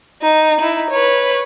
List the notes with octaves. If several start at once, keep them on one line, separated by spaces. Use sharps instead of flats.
D#4
D#4 E4
B4 C#5